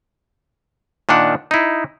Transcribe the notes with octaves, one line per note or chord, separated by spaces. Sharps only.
A#2 D#3 D4 F#5
D#4 E4